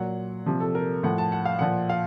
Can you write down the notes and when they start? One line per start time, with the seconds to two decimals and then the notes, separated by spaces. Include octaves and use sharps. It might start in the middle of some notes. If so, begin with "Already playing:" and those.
Already playing: A#2 F#3 F#5
0.46 C3 F3
0.60 A4
0.75 A#4
1.03 A2 F3 F#5
1.18 A5
1.32 F#5
1.45 F5
1.59 A#2 F3 F#5
1.90 F5